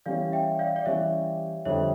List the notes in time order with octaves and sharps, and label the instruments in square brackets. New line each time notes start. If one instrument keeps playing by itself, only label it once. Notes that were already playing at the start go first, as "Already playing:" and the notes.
[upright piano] E3 G3 C#4 G4 [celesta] D5 F5
[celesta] E5 G5
D5 F5
D5
[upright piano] E3 G3 C#4 G4 [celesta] C#5 E5
[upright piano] F2 D3 G3 [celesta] C#5 E5